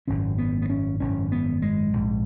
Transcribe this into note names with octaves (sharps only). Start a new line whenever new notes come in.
G#1 F#2 C#3 C#4
B3
B3
C#4
G#1 F#2 C#3 C#4
B3
G#3
A#1 G#2